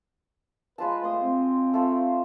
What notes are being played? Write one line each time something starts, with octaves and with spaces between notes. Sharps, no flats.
G#3 F4 B4 A5
A3 C6 D#6
C4
A3 F4 A4